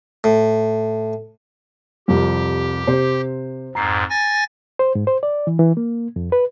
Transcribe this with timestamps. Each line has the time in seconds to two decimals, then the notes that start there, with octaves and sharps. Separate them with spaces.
0.24 A2
2.08 C2 F2 G4
2.87 C3 C5
3.75 F2 G#2 A#5 C7
4.10 G#5 A6 A#6
4.79 C5
4.95 G#2
5.07 C5
5.23 D5
5.47 E3
5.59 E3
5.77 A#3
6.16 F2
6.32 B4